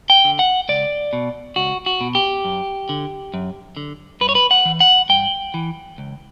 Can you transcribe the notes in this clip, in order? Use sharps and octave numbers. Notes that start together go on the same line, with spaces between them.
G5
D3
F#5
C#2 D5
B2
C#2 F#4
F#4
B2
G4
F#2
D3
F#2
D3
G2 B4
C#5
B4
F#5
E3
F#5
G2 G5
E3
C#2